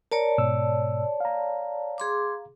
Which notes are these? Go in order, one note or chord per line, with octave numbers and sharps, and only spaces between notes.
A#4 C#5 D5 A5 A#5
G#2 B2 E6
F5 A#5
G#4 C6 D6